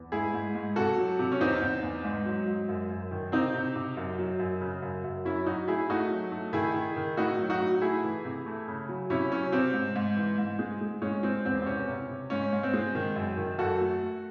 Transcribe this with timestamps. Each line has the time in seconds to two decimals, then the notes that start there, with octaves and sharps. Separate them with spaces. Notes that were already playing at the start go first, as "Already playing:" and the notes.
Already playing: E2
0.12 G#2 E4 G#4
0.34 G#2
0.55 G#2
0.76 C3 F#4 A4
0.97 F#3
1.19 C3
1.32 C#4
1.40 E2 C4 D#4
1.62 E2
1.83 E2
2.04 G#2
2.26 F#3
2.47 G#2
2.68 F#2
2.90 F#2
3.11 D#3
3.32 C3 C4 D#4
3.54 C3
3.75 C3
3.97 F#2
4.19 F#3
4.39 F#2
4.61 C#3
4.82 F#2
5.04 F#2
5.25 F#3 C#4 E4
5.46 F#3 D#4 F#4
5.68 A2 E4 G#4
5.89 A3 D#4 F#4
6.11 F#3
6.32 A3
6.53 D#3 E4 G#4
6.74 D#3
6.96 D#3
7.17 A2 D#4 F#4
7.38 F#3
7.50 D#4 F#4
7.60 A2
7.82 A3 E4 G#4
8.04 E3
8.25 C3
8.46 A3
8.68 C#3
8.89 F#3
9.10 C3 C#4 E4
9.31 F#3 C#4
9.52 C3 C4
9.73 G#2
9.96 G#2
10.17 E3
10.38 G#2
10.59 G#3
10.81 G#3
11.02 G#3 C#4
11.23 G#3 C4
11.45 E2 C4
11.61 C4
11.66 C3 C#4
11.88 C3
12.09 C3
12.30 G#2 C#4
12.53 G#2
12.63 C4
12.74 G#3
12.95 D#3
13.16 F#2
13.37 D#3
13.59 F#2 F#4 A4
13.80 A3
14.01 A3